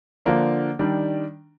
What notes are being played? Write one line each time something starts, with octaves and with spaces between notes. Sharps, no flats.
D3 F3 A#3 D4
D#3 G3 D4